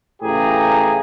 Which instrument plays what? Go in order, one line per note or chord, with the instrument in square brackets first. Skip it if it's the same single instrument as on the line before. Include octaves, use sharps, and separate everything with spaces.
[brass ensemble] A2 C#3 E3 G4 G#4 A#5